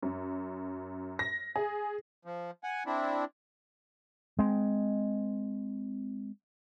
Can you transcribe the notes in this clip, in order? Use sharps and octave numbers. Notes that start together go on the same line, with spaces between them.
F#2
A#6
G#4
F3
F#5 G#5
C4 D4 E4
G#3 C4